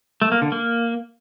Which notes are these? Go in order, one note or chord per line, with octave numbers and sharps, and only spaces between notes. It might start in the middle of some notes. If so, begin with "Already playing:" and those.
A3
A#3
D3
A#3